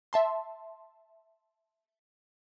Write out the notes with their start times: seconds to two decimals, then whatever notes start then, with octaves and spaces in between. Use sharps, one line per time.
0.13 E5 A5 C6